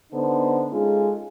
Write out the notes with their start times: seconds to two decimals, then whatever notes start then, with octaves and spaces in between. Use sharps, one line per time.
0.11 D3 B3 D#4 A4 C5
0.70 G#3 C#4 D#4 F4 G#4 A4